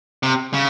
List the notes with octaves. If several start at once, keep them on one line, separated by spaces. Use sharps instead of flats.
C3
C#3